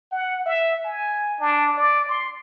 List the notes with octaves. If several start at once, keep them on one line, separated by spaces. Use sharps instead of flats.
F#5
E5
G#5
D4
D5
C6